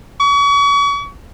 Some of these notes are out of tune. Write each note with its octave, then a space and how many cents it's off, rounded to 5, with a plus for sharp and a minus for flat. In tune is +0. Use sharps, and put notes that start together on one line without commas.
C#6 +35